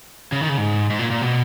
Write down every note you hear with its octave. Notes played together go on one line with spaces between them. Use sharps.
C#3
D#3
C#3
G#2
G#2
A#2
A#2
B2